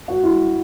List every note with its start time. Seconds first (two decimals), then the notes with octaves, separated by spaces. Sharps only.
0.08 F#4
0.23 E4